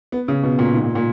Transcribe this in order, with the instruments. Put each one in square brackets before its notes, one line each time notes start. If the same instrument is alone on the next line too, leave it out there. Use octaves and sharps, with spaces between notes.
[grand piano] B3
C#3
B2
A#2
G#2
A#2
A#2